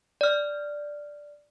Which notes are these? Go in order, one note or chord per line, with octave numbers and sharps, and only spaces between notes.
D5 F6